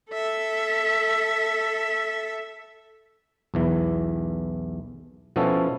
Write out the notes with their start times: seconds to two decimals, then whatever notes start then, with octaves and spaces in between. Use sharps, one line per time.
0.11 A4 E5
3.54 B1 E2 E3
5.36 B2 F3 B3 C#4 E4 A4